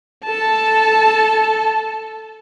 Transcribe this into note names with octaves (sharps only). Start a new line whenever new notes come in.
A4 A5